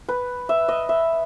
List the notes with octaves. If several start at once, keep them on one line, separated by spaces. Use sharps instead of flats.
B4
E5
D#5
E5